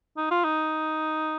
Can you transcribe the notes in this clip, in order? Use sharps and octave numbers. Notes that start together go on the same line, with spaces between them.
D#4
F4
D#4